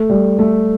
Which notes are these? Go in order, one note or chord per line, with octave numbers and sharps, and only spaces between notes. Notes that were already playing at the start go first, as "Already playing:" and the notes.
Already playing: A3
G3
A3